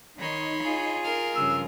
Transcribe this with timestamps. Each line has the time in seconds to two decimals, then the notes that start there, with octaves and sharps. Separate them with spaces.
0.19 D#3 D#4 C#5 B5 C6
0.63 F4 G#4
1.04 A#4 F6
1.35 G2 C#3 F3 E6